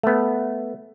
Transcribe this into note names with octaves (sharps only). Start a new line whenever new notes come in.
A3 B3